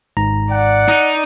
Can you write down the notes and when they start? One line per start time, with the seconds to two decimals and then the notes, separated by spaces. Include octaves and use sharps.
0.17 G#1 G#2 A#5
0.52 D5 F#5
0.88 D#4